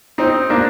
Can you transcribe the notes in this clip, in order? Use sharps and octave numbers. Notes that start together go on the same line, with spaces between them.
C4 D#4
A#3 D4